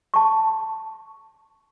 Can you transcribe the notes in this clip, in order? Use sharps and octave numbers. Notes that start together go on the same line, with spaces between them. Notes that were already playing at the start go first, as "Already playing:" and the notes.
A5 C#6